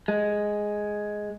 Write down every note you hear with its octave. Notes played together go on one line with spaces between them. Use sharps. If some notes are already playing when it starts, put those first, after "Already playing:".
G#3